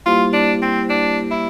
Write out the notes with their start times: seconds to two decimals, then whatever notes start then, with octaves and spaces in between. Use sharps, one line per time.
0.06 G3 A#3 E4 F4 G4 C5
0.33 D4
0.62 C4
0.90 D4
1.31 E4